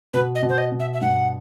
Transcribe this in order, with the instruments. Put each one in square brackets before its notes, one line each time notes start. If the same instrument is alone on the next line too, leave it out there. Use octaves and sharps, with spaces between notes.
[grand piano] B2 [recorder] B4
[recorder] D#5
[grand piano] B2
[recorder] C5
D#5
[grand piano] B2
[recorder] E5
E5
[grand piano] G2 [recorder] F#5